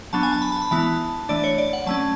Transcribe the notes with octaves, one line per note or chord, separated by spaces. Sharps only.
F#3 B3 D4 A5
G#5
A5
B5
A5
B5
E3 G#3 B3 E4 A5
E3 A3 D4 D5
C#5
D5
F#5
F#3 A3 C#4 A5